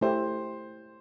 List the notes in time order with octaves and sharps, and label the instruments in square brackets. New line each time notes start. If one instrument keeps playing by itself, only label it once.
[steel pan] A3 E4 G4 [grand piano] C5